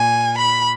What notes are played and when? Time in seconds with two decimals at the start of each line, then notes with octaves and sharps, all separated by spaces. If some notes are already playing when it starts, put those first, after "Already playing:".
Already playing: A#2 G#5
0.38 B5